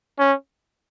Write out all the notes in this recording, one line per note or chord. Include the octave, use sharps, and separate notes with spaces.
C#4